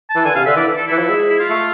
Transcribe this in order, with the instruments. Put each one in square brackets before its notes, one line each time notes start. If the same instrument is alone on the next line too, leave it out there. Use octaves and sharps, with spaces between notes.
[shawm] A5
[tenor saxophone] E3
[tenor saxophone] D3 [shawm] G#5
[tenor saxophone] C3 [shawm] F5
[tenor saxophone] D3 [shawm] E5
[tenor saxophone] E3 [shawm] D5
[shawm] A4
[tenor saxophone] E3 [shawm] E4
[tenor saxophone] F3
G#3
[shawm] E4
F4
[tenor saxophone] A3